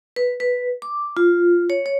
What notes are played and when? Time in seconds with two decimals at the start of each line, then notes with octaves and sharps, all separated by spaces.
0.16 B4
0.40 B4
0.82 D6
1.17 F4
1.70 C#5
1.86 C#5